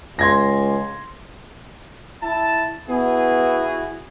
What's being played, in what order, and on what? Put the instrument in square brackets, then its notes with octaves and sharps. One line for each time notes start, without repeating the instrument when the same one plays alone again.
[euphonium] C#2 [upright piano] C6 G#6 A#6
[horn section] E4 A5
[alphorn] B3 [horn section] E4 F#4 G#4